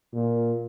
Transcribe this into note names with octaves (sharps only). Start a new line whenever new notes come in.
A#2